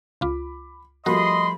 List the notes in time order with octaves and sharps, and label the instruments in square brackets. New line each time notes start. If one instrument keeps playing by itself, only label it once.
[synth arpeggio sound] C#2 F4 [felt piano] B5 D6
[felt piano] F3 G3 A3 [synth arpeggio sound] F#4 A#4 [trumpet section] D#5 C6 [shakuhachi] B5